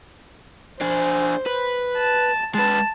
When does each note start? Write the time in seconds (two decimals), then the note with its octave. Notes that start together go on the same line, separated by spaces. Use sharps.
0.81 D4 G#4 C5
1.46 B4
1.97 A5
2.55 G#3 B4 A5